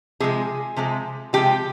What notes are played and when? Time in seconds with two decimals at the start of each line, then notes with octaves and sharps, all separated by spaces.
0.20 C3 F3 G#3 G#4
0.77 C3 F3 G#3
1.33 C3 F3 G#3 G4